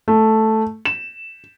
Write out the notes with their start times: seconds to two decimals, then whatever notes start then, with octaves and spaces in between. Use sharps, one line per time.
0.08 A3
0.85 E7